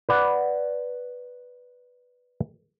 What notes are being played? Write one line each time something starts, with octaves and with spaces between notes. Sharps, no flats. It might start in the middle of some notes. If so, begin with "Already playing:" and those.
B4 D5 F#5